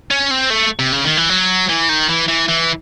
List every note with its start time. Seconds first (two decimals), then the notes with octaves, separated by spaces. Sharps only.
0.11 C#4
0.31 C4
0.50 A3
0.79 C3
0.92 C#3
1.04 D#3
1.17 E3
1.29 F#3
1.69 E3
1.89 D#3
2.09 E3
2.29 E3
2.49 E3